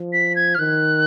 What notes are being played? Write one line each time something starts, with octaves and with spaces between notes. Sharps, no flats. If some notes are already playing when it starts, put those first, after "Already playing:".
Already playing: F3
B6
G#6
F6
D#3 F#6